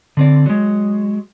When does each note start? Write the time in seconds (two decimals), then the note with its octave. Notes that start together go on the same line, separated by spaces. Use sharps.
0.17 D3 C4 D5
0.46 F#3 G#3